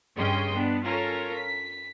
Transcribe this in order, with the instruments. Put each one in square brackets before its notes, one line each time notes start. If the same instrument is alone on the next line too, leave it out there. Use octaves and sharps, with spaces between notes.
[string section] G2 C#3 C#4 D#5 G5 C6
B3 D4
C#4 F4 A4 A#4 C#5
B6